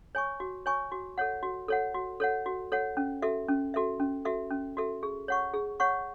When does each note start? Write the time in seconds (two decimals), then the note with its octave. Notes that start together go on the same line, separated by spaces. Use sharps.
0.15 C#5 G#5 C#6
0.40 F#4
0.66 C#5 G#5 C#6
0.92 F#4
1.18 A4 C#5 F#5
1.43 F#4
1.68 A4 C#5 F#5
1.94 F#4
2.20 A4 C#5 F#5
2.46 F#4
2.72 A4 C#5 F#5
2.97 C#4
3.22 F#4 A4 E5
3.49 C#4
3.74 F#4 A4 E5
4.00 C#4
4.25 F#4 A4 E5
4.51 C#4
4.77 F#4 A4 E5
5.03 G#4
5.28 C#5 F#5 C#6
5.54 G#4
5.80 C#5 F#5 C#6